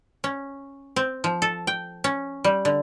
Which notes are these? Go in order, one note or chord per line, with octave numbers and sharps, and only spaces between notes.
C#4
C4
F3
A4
G5
C#4
G3
D3